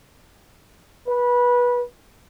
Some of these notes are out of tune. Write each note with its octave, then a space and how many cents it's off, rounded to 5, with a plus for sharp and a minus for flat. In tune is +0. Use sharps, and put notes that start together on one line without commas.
B4 -20